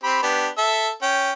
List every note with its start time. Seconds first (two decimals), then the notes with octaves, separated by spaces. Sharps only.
0.04 C4 G4 B5
0.22 B3 D4 G4
0.58 A4 E5
1.02 C#4 G5